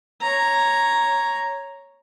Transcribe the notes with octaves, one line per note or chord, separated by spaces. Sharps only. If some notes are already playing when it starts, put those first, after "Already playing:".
C#5 A#5